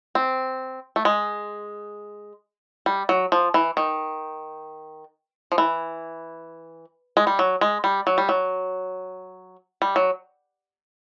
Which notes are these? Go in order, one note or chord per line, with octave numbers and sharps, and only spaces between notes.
C4
A3
G#3
G3
F#3
F3
E3
D#3
F3
E3
G#3
G3
F#3
G#3
G3
F#3
G3
F#3
G3
F#3